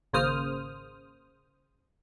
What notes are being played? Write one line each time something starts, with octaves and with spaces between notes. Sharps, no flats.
G#1 C#3 A#3 C5 D#6 F6